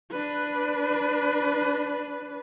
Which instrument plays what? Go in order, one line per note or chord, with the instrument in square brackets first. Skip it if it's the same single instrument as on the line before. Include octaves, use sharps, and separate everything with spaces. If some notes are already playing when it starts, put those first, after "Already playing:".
[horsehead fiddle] D4 B4